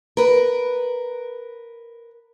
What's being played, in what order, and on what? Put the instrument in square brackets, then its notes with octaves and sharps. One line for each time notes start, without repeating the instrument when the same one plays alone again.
[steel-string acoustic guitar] A#4 B4